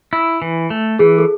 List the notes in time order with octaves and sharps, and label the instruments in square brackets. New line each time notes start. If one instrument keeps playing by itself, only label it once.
[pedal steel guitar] E4
E3
A3
[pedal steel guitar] E3 [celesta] G#4
[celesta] A4